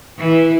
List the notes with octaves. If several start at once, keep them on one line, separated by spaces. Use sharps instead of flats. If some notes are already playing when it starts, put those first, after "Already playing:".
E3